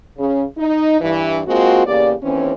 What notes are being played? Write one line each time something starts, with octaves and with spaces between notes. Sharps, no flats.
C#3
D#4
G2 E3
G#3 A#3 C4 F4 F#4
E2 C#3 A#3 G4 D5
D#2 E3 C4 C#4